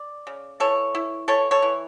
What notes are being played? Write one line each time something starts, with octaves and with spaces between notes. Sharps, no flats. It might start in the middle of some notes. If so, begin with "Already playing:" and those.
Already playing: D5
C#3
E3 A4 C#5
E4
E3 A4 C#5
A4 C#5
E3